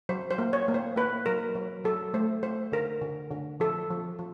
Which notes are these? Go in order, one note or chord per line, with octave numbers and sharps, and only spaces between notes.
F#3 C5
C5
A#3
C#5
A#3
C5
A#3 B4
F#3 A#4
F#3
F#3 A4
A3 C5
A3 C5
D3 A#4
D3
D3
F3 A4
F3
F3